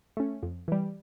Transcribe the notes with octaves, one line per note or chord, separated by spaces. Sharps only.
A3 C#4
F2
E3 G3